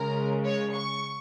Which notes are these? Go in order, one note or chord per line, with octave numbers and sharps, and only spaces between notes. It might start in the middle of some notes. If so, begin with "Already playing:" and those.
Already playing: C#3 G#3 A#4
C#5
C#6